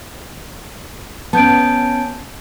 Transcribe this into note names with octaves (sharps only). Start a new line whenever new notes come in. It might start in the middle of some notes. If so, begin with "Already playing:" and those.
B3 C#4 A5 G6 D7